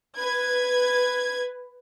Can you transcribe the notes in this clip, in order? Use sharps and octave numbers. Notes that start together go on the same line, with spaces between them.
B4 G#6